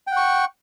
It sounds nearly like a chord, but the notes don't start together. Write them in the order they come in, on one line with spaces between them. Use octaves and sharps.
G5 F#5 C#6